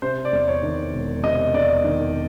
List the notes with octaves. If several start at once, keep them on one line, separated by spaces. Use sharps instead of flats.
C3 C5
D5
E2
C#5
D#3
E1
C3 D#5
E2 D5
D#3